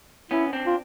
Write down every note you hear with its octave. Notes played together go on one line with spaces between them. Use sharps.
B3 C#4 E4
C4 D4
F4